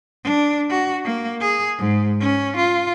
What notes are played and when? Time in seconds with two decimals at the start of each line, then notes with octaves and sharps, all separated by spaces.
0.24 D4
0.70 F#4
1.04 A#3
1.40 G#4
1.78 G#2
2.20 C#4
2.57 F4